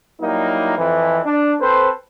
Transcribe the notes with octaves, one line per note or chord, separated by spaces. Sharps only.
F#3 G3 A#3 D#4 E4
F2 E3
D4
C4 A4 B4 C5